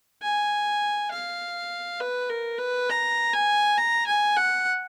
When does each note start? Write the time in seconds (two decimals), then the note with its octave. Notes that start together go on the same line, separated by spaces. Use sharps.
0.23 G#5
1.11 F5
2.01 B4
2.30 A#4
2.59 B4
2.90 A#5
3.33 G#5
3.78 A#5
4.07 G#5
4.37 F#5